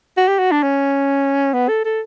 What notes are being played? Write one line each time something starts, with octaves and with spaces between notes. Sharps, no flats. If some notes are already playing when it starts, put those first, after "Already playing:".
F#4
G4
F#4
D4
C#4
B3
A4
A4